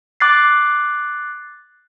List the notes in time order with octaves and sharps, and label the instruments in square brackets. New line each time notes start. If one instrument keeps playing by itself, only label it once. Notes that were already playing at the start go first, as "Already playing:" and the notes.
[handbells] D6 F#6 A6 C7